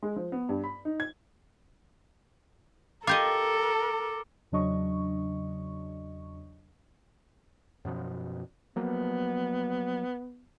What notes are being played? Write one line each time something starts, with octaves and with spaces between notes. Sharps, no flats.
G#3
F3
B3
G2
B5
D#4
G#6
F4 G4 A4 A#4 D#5 D6
E2 C#3 F#3 D4 D#5 C#6
F#2 B2 F3
F3 F#3 A#3 B3